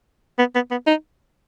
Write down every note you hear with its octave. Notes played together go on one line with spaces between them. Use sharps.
B3
B3
B3
D#4